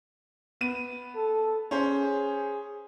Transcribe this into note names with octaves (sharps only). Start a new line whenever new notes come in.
B3 D#7
A4
C#4 G#4 C5